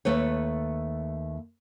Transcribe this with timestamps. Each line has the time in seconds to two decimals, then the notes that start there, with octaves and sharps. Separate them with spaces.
0.05 D#2 A3 B4 C#5